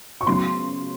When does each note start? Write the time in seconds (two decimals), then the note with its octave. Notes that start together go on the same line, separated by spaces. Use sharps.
0.21 C#6
0.27 C#3 F#3 B3 C6